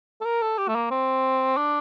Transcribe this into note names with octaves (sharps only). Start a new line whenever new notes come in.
A4
A#4
A4
G4
A3
A#3
C4
D4